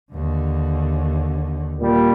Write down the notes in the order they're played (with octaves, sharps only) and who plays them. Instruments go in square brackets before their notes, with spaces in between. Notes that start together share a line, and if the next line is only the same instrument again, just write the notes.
[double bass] D#2 D3
[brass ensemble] A#2 G3